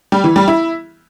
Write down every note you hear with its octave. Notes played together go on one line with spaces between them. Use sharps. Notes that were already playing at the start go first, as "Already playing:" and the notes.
G3
E3
G3
E4